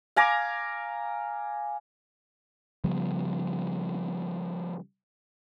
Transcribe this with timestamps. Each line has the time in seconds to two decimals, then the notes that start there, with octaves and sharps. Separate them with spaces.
0.16 F5 G#5 A#5 D6
2.84 C#3 F3 G3 B3